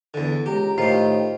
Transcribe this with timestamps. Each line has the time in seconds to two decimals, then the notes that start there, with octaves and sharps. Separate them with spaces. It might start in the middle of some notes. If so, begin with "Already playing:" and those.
0.14 E2 D3
0.46 C#2 G4 A#5
0.78 A2 D#3 F4 G4 C5 D#5